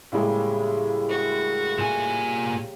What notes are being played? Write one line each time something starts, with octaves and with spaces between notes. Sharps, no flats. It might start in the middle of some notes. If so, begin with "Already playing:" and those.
A2 C#3 G3 G#3 A#3
F#4
A#2 G#5